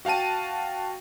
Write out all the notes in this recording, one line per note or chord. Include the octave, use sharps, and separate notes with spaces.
F#4 F5 G5 A5 D#7